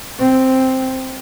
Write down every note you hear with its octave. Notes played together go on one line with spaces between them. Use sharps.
C4